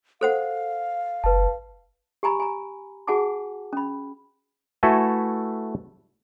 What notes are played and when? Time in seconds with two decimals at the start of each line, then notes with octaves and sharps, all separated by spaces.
0.21 A4 C5 F5 F#5
1.24 F#1 B4 A5
2.23 G4 G#5 A#5 B5
2.40 G#5 A#5
3.07 F#4 G#4 F#5 G#5 A5 D6
3.73 C#4 B5
4.83 A3 E4 F#4 A4 B4 G#5